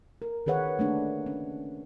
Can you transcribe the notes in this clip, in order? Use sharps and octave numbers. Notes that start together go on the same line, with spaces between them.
A#4
D#3 G#4 B4 C#5 F#5
A3 A#3 D4 G#4
C#4